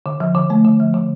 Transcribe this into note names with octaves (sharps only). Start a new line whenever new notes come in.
D3
F3
D3
A3
D3
F3
D3